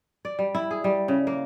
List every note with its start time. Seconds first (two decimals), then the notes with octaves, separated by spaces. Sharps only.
0.25 D5
0.39 G3
0.55 E4
0.71 G#4
0.84 G3
1.08 C#3
1.27 A#3